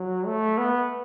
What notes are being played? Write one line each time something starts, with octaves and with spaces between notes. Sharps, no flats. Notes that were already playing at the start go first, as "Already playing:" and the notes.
Already playing: F#3
A3
B3